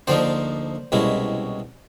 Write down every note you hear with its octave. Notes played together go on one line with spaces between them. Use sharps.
D2 D3 F3 A#3 D#4 C5 D5
C2 B2 G#3 C#4 E4